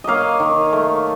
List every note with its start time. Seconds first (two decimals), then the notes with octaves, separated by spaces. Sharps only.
0.04 A#3 C#5 D#5 F5
0.40 D#3
0.73 A3